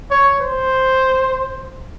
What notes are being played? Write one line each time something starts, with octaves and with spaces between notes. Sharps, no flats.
C#5
C5